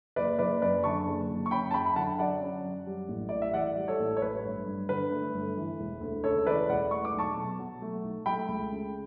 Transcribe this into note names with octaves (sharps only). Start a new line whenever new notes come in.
F#1 B4 D5
F#1 B4 D5
F#2 B4 D5
D3 A5 C#6
F#1
F#1
C#6
C#4 G5 B5
A5
F#2 G5 B5
B5
D3 F#5 A5
F#3 D5 F#5
C#4
F#2
G3
A1
A2 D5
E5
E3 D5 F#5
G3
A4 C#5
A1
C#5
A3 B4
G1
G2
D3 B4
A3
G1
E3
E1
D2
C#3 A4 C#5
E3 B4 D5
E1 D5 F#5
A3 C#6
D6
B1
A5 C#6
B2
F#3
A3
B1
A3 G5 B5
C#2
C#3